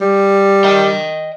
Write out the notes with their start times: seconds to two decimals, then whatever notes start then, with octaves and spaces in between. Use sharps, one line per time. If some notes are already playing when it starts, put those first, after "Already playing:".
0.01 G3
0.64 D#5 G5